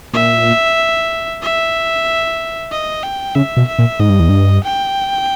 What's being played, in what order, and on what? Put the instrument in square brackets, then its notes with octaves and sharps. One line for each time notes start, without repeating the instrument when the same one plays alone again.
[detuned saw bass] A#2 [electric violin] E5
[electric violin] E5
D#5
G5
[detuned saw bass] C#3 [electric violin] E5
[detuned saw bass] B2
[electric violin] E5
[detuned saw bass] A#2
[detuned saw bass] G#2 [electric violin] D#5
[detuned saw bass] G2
E2
G2
[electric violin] G5